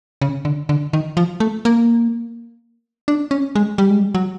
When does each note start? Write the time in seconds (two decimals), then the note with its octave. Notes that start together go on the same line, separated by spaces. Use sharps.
0.22 C#3
0.45 D3
0.69 D3
0.93 D#3
1.17 F3
1.40 A3
1.65 A#3
3.08 D4
3.31 C#4
3.55 G#3
3.78 G3
3.90 G#3
4.00 G3
4.15 F#3